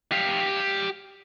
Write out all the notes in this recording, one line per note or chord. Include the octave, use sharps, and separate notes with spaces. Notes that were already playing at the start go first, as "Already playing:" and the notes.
G4 F5